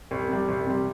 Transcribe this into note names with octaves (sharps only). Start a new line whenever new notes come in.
C2
C3 G3
C2
C3 G3